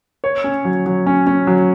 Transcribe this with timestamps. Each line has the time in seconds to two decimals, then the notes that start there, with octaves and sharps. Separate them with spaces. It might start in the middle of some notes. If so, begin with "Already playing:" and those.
0.24 C#5
0.44 C#4
0.65 F#3
0.86 F#3
1.06 C#4
1.27 C#4
1.47 F#3